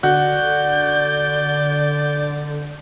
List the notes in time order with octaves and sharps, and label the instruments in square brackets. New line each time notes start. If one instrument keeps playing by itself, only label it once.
[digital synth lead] D3 [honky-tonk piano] F#4 [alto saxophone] D5 [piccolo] G6